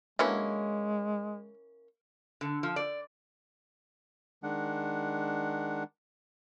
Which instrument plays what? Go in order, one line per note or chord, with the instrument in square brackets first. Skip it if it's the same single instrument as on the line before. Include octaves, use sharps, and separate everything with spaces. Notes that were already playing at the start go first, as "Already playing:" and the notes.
[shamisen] D3 F#3 B4 [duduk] G#3 [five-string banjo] A#3 C#4 E4
[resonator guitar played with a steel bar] D3
F3
D5
[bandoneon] D#3 G#3 D4 F#5